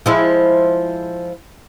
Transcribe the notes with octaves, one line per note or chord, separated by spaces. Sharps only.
F3 G#3 E4